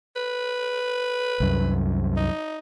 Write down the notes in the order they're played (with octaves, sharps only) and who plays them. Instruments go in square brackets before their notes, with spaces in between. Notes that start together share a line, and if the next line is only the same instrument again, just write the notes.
[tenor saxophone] B4
[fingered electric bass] C2 F#2
[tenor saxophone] D#4